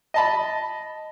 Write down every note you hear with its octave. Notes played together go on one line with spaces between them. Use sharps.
D#5 A5 B5